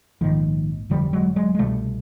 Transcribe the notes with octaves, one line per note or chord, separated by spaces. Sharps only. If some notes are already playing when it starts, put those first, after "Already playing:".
A#1 G#2 D#3 F3
G1 F2 D3 F3 G3
F#3 G#3
F#3 G#3
G#3
C2 B2 G3 A3